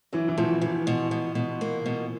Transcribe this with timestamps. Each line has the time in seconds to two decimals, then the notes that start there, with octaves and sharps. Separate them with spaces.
0.13 E3 F#3
0.28 E3
0.37 B2 F3
0.61 B2 E3
0.87 B2
1.11 B2
1.35 B2
1.61 A#3
1.86 B2